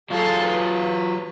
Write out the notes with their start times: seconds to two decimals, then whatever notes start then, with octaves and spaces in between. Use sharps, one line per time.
0.10 F#3 F4 G#4 A4 C6
0.46 B4